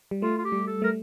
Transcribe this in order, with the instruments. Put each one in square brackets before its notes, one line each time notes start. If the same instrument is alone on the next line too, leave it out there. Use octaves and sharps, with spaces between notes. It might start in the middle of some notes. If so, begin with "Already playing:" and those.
[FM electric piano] G3
[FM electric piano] A3 [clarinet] F4
[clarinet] F4
G4
[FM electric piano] G3
[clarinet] A4
[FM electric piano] A3 [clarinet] A#4